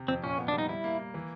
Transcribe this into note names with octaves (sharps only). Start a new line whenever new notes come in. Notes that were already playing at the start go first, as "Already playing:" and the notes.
Already playing: C3
F2 C4
A#2 C#4
B3
D4
G3
D#4
G3 E4
A#3
A#3
E3